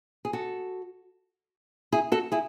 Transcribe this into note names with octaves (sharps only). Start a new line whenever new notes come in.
G#4
F#4 A4
E4 G#4
F#4 A4
E4 G#4